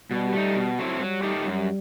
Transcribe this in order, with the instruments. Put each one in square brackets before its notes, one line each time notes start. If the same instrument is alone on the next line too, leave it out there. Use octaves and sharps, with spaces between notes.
[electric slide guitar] B2 [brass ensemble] G3
[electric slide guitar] A3
D#4
B2
F#3 A3 C4 E4
[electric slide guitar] F#3 [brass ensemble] G3
[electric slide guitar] A3 D#4 G4
[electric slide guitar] F#2 [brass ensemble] G3